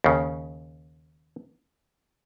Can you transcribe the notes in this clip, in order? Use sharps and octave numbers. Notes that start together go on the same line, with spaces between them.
D#2 C#3